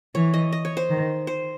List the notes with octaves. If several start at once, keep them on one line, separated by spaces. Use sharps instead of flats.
E3 C#5
D#5
D#5
C#5
C5
D#3
C5